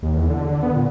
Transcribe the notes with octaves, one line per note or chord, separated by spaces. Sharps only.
D#2
E2
D3
D3
B3
A#2